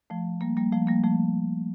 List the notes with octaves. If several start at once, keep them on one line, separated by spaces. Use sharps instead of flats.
F3 A3
G3 A#3
G3 A#3
F3 A3
G3 A#3
F3 A3